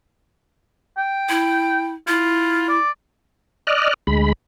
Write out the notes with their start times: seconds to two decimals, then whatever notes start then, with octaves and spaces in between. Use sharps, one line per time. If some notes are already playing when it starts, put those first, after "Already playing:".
0.97 G5
1.29 E4
2.08 E4 F4
2.69 D5
3.67 D5 D#5 F6 F#6
4.07 D2 G#3 B5